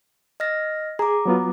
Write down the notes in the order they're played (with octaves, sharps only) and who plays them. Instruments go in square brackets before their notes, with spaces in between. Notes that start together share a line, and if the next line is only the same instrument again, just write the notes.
[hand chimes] D#5 F6 A#6
[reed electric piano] G#4 [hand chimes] A#5 D6
[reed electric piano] F#3 B3 F4